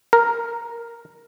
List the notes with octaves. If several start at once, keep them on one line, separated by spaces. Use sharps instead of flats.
A#4